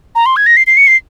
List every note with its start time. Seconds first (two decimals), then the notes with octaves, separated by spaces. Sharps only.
0.15 A#5
0.26 C6
0.36 G#6
0.46 A#6
0.57 C7
0.67 C7
0.77 C#7
0.87 C7